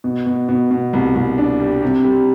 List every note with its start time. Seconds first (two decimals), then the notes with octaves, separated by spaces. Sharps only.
0.04 B2
0.26 B2
0.49 B2
0.71 B2
0.93 C2
1.15 C2
1.38 D4
1.60 G3
1.82 C3
2.04 G3